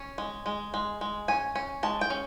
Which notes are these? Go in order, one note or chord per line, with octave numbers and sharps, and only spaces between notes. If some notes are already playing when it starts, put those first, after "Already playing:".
Already playing: C#4
G#3
G#3
G#3
G#3
C#4 G#5
C#4
G#3 A5
G5
C#4